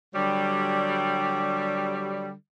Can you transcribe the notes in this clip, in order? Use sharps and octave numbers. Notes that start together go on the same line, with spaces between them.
D3 F#3 G3